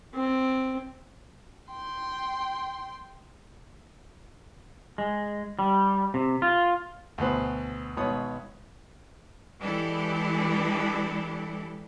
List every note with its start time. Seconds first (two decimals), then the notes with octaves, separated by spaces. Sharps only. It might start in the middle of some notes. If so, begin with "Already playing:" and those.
0.14 C4
1.72 G5 C6
4.98 G#3
5.59 G3
6.14 C3
6.42 F4
7.18 D2 B2 B4 C5
7.97 G#1 B2 B4 C#5 D#6
9.60 E3 G#3 D4 E4 G4 A4